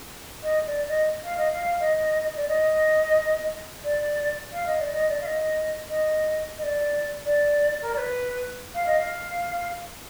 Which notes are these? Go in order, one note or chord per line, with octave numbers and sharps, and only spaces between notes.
D#5
D5
D#5
F5
D#5
F5
D#5
D5
D#5
D5
F5
D#5
D5
D#5
D5
F5
D#5
D#5
D#5
D5
D5
A#4
D5
B4
F5
D#5
F5